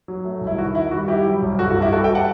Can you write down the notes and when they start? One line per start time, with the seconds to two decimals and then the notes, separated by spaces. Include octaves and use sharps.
0.08 F#3
0.25 A3
0.41 C2
0.47 E4
0.58 D#3 F#4
0.75 D#3 E4
0.91 G3 F#4
1.08 G3 E4 G4
1.25 F#3
1.42 C2
1.58 G2 F#4 A4
1.70 F#4
1.76 G2
1.82 E4 G4
1.92 G3 F#4 A4
2.04 E5 G5
2.15 F#5 A5